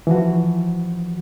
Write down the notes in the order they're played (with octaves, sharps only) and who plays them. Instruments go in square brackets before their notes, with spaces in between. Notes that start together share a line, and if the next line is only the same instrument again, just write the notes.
[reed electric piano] E3 F3 F#4